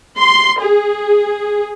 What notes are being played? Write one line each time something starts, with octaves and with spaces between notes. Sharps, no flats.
C6
G#4